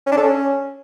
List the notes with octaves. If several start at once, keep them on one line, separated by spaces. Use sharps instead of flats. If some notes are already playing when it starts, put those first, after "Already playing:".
C#4
D4
A4
C#4